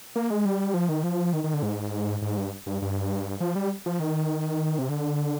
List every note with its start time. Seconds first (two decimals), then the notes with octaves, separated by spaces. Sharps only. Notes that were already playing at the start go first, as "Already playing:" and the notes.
0.16 A#3
0.30 G#3
0.45 G3
0.74 F3
0.89 D#3
1.03 F3
1.33 D#3
1.44 D#3
1.54 D3
1.63 G#2
2.22 G#2
2.37 G2
2.66 G2
2.82 G2
3.41 F3
3.55 G3
3.86 F3
4.00 D#3
4.79 C3
4.89 D3